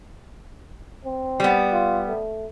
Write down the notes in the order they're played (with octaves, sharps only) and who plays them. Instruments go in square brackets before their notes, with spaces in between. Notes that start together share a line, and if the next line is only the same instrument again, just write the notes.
[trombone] C4
[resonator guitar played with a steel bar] G3 B3
[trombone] F4
A3